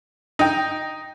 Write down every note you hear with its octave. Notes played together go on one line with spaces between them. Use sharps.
D#4 G5